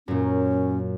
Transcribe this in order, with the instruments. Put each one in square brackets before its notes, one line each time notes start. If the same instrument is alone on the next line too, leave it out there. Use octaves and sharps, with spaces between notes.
[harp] F#2 A#2 [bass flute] C#4